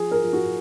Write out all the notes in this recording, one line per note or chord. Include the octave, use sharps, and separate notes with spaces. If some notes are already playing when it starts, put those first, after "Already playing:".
Already playing: F3 G#4
A#4
F3
F#4